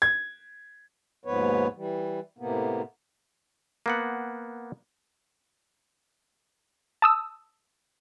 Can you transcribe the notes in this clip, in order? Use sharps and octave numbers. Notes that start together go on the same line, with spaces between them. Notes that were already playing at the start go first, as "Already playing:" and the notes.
G#6
D#2 G#2 F3 B3 B4 C#5
E3 G3
A2 C3 A#3 B3
A#3 B3 F#5
A5 D#6 E6